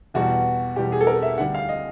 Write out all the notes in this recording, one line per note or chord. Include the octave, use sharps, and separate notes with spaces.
E2 B2 G3 F#4
E2 B2 G3 G4
G#4
A4
A#4
E5
D2 D3 G3 F#5
F5
D#5